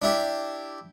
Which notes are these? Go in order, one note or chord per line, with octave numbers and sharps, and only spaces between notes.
D4 E4 G4